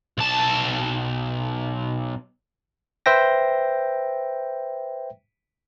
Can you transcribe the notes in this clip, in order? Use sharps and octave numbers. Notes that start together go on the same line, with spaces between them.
B1 A5
B4 C5 E5 G5 A#6